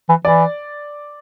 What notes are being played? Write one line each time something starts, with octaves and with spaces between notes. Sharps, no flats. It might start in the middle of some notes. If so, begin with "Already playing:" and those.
E3
E3 D5